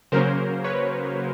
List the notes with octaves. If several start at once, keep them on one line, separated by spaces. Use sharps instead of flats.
C#3 F#3 A#3 C#4 A#4 C5
B4 C#5